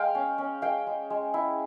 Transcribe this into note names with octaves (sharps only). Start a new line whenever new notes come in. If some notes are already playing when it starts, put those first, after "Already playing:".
Already playing: G#3 F5 G5
C#4
C#4
G#3 F5 G5
G#3
G#3
E4